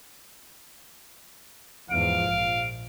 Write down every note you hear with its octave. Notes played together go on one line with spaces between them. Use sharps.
E2 G#2 F3 F5 D7
A#1 D7